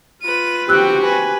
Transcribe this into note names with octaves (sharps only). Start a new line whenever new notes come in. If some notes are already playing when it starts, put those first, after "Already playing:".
F4 B4 D#7
C4 F#4 G4 G5 E6 F#6
G4 B4 G#5